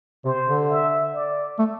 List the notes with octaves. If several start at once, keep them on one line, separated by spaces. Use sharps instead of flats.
C3 C5
D3
E5
D5
A3